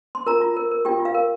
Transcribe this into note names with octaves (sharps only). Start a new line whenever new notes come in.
C6
F4 A#4 A#5
F4
A#4
A#4
F4 G4 G5
F4
F5
A#4